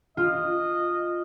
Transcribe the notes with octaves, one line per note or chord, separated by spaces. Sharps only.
F4 D#5